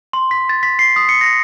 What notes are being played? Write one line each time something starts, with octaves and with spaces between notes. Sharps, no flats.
C6
B6
A6
B6
C7
D#6
C#7
A#6